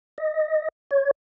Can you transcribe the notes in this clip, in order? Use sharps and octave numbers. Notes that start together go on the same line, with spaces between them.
D#5
C#5